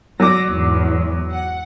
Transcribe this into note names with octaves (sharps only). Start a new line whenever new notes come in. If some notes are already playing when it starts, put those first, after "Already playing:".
F#3 D5 D6 A#6
E2 G#2
F#5